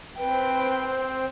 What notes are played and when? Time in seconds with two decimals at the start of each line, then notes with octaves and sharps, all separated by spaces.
0.19 C4 B4 G5